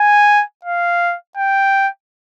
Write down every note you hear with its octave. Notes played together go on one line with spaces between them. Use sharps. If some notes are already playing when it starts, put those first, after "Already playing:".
Already playing: G#5
F5
G5